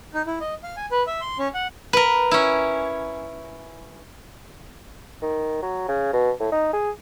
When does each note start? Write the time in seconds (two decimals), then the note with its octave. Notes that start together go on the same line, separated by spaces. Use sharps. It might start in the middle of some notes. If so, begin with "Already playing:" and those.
0.14 D#4
0.27 E4
0.40 D#5
0.63 F5
0.77 G#5
0.91 B4
1.07 E5
1.21 C6
1.38 C#4
1.54 F#5
1.93 A#4 B4
2.31 C#4 E4
5.22 D#3
5.62 F#3
5.88 C#3
6.13 B2
6.40 A2
6.52 D#4
6.73 G#4